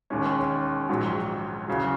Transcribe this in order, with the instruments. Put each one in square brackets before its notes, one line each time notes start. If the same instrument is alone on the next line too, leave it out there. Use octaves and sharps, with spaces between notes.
[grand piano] E1 D#2 D#3 G#3 C#4
A#1 G#2 D#3 F#3
E2 C#3 F#3